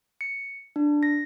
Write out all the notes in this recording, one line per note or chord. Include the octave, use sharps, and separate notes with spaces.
C#7
D4
A#6